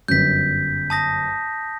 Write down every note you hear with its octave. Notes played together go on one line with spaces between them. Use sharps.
G1 F#2 G6 B6
A5 D#6 A#6